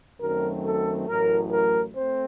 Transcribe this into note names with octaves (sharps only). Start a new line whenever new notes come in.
F#2 D#3 F#3 A3 C4 A#4
A4
A1 A2 F#3 A#4
A#4
A3 C4 C5